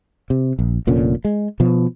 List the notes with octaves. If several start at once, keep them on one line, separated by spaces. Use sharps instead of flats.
C3
A#1
F1 A#2 D3 C#4
G#3
B2 F3